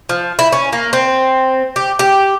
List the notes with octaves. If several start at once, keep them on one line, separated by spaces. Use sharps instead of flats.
F3
E4
C#4
A#3
C4
G4
G4